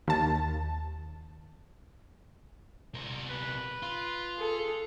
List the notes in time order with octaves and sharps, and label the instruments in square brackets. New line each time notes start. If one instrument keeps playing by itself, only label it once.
[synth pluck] D#2 A5
[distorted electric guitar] C3 A#4
[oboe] B4
[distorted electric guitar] F4
[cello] G#4 A4